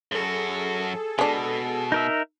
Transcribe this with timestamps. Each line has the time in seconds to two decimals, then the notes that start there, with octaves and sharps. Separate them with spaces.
0.12 F#2 F#4 G#4 A4
1.19 B2 G#3 D4
1.92 D#4 A#4 E5